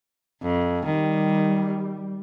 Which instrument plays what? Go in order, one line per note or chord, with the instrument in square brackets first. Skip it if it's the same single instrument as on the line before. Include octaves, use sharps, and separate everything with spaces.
[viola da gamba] F2
[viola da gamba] D#3 [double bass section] G3